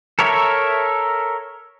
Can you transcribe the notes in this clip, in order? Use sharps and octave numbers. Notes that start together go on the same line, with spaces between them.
A4 A#4 C#5 E5